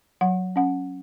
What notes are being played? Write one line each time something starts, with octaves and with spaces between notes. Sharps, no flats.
F#3 F#5
C#4 F#5